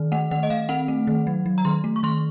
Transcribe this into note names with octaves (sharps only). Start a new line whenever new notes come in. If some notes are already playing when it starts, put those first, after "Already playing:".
Already playing: D#3
A3 F#5
D#3 F#5
D#5
D#3 F5
C4 F#5
A3
D#3
F#3
F#3
A#5
D#3 C6
A3
C#6
D#3 C6